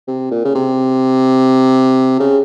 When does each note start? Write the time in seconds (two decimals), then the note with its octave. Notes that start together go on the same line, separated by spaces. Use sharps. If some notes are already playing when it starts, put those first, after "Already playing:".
0.08 C3
0.31 A#2
0.45 C#3
0.55 C3
2.20 C#3